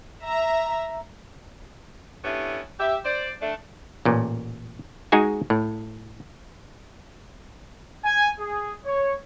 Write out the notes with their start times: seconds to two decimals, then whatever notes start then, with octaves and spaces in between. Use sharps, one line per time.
0.24 E5 A#5
2.24 A3 B3 C#4 D4 E4 G4
2.79 G4 E5
3.04 C5 D5
3.41 A3 D4
4.05 A1 A#2
5.12 G#3 D#4 F#4 G#4 G#5
5.50 A2
8.04 G#5
8.39 G#4
8.86 C#5